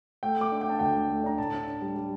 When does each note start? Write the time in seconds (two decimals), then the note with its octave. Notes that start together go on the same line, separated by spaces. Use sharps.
0.23 A3 G5
0.36 A3 D6
0.52 D4
0.61 G5
0.67 D4 A5
0.79 D2 G5
0.96 A3
1.09 A3
1.24 D4 A#5
1.38 A2 A5
1.53 D4
1.67 D4
1.82 G3
1.96 G3